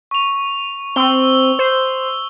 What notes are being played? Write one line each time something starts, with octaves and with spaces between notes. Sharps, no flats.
C#6 F7
C4 E6 G7
C5